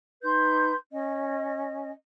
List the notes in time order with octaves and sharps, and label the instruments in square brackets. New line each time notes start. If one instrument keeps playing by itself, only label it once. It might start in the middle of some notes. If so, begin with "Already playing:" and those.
[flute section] D#4 B4 C6 G6
C#4 D#5